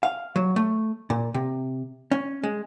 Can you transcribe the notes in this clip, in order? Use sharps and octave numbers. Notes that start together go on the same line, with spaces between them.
F5
F#3
A3
A#2
C3
C#4
G#3